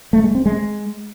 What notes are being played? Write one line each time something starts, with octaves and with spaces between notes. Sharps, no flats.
A3
G#3
C4
G#3